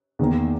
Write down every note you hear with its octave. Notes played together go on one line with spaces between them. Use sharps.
E2 D#3 A#3